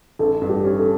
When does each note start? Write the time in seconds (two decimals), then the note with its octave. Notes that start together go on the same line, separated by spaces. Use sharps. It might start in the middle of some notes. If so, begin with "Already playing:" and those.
0.19 A1 A4
0.42 G2
0.49 G4
0.65 C#4
0.79 A4